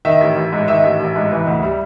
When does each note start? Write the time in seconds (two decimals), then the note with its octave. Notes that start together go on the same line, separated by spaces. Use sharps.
0.05 D#3 E5
0.21 A1
0.36 A1
0.52 G#2
0.68 D#3 E5
0.83 A1
1.00 A1
1.16 G#2
1.32 E3
1.47 D2
1.62 G3